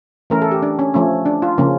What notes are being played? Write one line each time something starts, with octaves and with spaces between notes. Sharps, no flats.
E3 A3 C#4 A#4
A4
G4
D4
C#4
F3 A3 C#4
D4
F4
C#3 F3 A#3 C#4